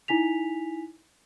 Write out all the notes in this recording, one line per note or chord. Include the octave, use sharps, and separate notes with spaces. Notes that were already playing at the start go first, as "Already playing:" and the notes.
D#4 E4 G#5 B6 F7